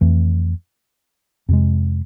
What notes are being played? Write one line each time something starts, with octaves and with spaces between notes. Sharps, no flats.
F2 E3 A3
F2 C3 G#3